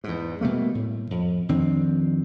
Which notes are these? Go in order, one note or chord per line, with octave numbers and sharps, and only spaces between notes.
E2 G#2
B2 G3 A3 A#3
A2
F2
F2 D#3 C4 D4